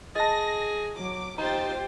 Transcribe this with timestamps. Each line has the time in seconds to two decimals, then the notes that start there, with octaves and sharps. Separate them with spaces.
0.16 G#4 D#5 A5 A#6
0.97 F#3 D6
1.38 D#4 F4 G4 C5 G5 A#5 A6